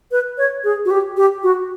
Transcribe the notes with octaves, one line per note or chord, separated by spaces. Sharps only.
B4
C#5
G#4
F#4
G4
G4
F#4